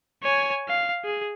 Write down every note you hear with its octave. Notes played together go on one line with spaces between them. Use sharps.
C#5 G#5
F5
G#4